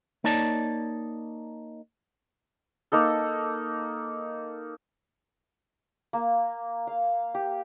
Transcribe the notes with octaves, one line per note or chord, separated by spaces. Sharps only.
A#3 D#4 C#5 D5 A5
A#3 D#4 A4
A#3
F5
G4